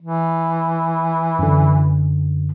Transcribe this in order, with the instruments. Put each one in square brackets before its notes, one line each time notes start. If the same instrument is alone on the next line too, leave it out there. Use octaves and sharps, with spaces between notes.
[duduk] E3
[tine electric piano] F#2 D3